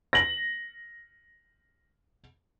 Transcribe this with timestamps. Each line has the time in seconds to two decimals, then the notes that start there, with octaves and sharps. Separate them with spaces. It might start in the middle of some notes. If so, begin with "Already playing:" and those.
0.13 A#6 F#7